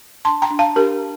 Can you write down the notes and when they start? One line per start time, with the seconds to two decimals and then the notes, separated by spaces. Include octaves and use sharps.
0.25 D4 A5 C6
0.42 G5 A#5
0.51 D4
0.59 F5 A5
0.76 D4 G4 A#4